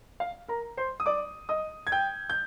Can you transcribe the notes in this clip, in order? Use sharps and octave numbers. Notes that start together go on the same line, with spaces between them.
F5
A#4 A#5
C5 C6
D#6
D5 D6
D#5 D#6
G#6
G5 G6
G6